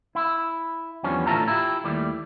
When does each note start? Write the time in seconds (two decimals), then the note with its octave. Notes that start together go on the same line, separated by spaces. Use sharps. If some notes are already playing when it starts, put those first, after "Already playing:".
0.15 E4
1.03 E2 G2 F3 G3 B3 C#4
1.27 A2 D3 F4 E5 A5 A#5
1.48 E4 F4 G4
1.84 D#2 G3 A3 E4 D5